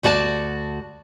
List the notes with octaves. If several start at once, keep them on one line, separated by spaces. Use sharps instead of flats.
D2 F#4 D5 G5 A5